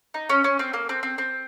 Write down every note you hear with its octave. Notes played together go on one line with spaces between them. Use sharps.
D#4
C#4
C#4
C4
A#3
C4
C4
C4